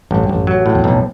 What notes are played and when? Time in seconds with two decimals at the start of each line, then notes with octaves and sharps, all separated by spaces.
0.11 A1 G2
0.23 G2
0.29 A1
0.35 F#2
0.47 F#3
0.66 A2
0.75 E2
0.84 B1 F2